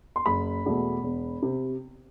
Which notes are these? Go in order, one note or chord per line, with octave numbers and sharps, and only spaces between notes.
C6
F#1 B5
E2 B2 A3
E1
C3